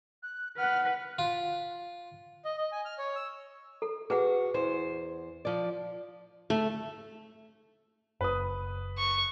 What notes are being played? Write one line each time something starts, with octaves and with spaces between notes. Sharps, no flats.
F#6
B4 F#5 F6
F4
D#5
D#5
G#5
F6
C#5
E6
A4
F#4 G#4 B4 F#5
E2 C5
F3 D5
A3 E5
F#1 B4 D#6
C#6